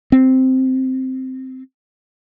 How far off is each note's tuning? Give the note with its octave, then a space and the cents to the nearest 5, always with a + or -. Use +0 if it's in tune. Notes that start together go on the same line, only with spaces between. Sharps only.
C4 -5